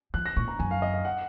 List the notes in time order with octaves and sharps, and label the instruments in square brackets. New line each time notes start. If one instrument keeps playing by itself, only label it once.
[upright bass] F3 [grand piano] F#6
[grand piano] A#6
[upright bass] A#2 [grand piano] C#6
[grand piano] A#5
[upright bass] F#2 [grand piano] G#5
[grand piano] F5
D#5
F5
F#5